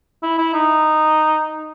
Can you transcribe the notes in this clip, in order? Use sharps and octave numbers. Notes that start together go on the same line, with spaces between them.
E4
E4
D#4